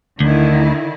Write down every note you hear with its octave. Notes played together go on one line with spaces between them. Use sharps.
D2 D3 D#3 E4